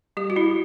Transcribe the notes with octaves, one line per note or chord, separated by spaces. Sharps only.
G3 G4
F#4
G3 E4